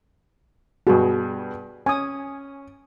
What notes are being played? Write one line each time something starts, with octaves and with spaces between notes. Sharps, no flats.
G2 B2 F#4 G#4
C#4 G#5 D#6